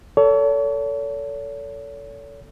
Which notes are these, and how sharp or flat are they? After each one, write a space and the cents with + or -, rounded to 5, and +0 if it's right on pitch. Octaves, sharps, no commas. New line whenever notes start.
A4 +15 C#5 +40